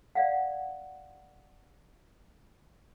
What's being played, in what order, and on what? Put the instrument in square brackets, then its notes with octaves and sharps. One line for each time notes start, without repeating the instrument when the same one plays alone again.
[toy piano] D5 F5 F#5